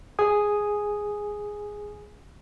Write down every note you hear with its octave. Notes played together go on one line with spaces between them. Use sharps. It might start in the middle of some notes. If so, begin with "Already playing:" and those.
G#4 G#5 D#6